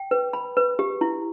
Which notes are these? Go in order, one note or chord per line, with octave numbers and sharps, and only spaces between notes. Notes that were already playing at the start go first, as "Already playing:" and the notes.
Already playing: G5
B4
B5
B4
G4
E4